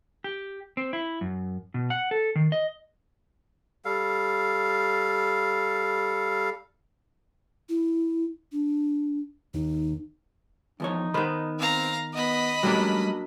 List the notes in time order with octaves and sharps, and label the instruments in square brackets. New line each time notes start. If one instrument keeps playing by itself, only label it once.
[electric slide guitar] G4
C4
E4
F#2
B2
F#5
A4
D#3
D#5
[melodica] G3 A4 F5
[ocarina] E4
D4
[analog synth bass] D#2 [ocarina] D#4
[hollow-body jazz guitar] E2 F3 C#5 [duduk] D#4
[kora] D#3 B3 [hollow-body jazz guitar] C5 B5
[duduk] C4 [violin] F5 A#5
[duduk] B3 [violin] D#5 B5
[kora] F#3 A#3 D4 [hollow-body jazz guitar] G3 A3 [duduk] C#4